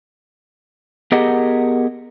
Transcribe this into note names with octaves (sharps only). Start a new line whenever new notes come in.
B3 G4 G#4 A#4 D#5 F#5